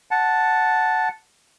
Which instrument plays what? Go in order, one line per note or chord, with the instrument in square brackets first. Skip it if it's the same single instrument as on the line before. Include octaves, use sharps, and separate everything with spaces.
[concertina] F#5 A5